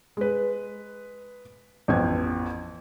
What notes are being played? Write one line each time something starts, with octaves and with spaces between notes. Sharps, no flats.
G#3 B4
A1 F2 B3 G#6